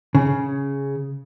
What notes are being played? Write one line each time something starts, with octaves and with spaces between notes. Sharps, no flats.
C#3